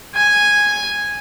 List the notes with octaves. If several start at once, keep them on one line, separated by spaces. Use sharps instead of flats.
G#5